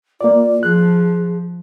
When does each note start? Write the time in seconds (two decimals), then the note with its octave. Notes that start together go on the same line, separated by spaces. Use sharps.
0.21 A#3 F4 D5
0.63 F3 G#4 F#6